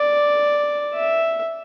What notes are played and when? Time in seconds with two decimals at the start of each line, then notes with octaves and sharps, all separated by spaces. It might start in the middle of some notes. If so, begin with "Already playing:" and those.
Already playing: D5
0.94 E5